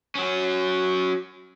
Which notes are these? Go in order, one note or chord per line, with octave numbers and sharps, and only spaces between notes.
F#3 C#4